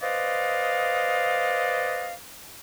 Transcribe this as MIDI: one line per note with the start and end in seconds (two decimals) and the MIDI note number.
0.02 2.15 71
0.02 2.15 72
0.02 2.15 74
0.02 2.15 75
0.02 2.15 77